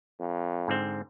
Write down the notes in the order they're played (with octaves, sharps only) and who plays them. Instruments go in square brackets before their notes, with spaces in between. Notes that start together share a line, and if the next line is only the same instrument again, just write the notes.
[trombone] F2
[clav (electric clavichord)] G#2 D3 C4